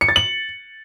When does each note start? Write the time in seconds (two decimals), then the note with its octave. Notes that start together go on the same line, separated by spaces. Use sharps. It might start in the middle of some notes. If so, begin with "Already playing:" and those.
0.01 C#7
0.09 A6
0.16 F#7